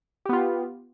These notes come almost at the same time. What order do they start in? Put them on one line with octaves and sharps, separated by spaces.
G4 B3 F4